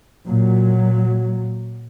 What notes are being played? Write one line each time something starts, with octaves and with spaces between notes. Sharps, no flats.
A#2 F#3